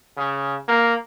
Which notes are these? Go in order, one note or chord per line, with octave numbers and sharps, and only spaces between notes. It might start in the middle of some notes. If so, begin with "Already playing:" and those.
C#3
A#3